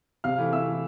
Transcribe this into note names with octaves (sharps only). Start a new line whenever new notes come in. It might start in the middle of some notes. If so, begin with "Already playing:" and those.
C3 F5 F6
E3 A3 E4
C3 E5 E6
E3 A3 E4